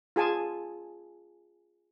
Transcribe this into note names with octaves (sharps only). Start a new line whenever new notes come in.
F4 G#4 G#5 A5